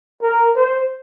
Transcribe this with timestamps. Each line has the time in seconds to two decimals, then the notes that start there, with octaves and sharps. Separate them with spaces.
0.22 A#4
0.56 C5